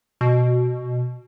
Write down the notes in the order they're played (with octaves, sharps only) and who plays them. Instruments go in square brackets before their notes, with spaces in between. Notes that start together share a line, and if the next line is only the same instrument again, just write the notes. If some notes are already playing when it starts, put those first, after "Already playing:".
[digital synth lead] B2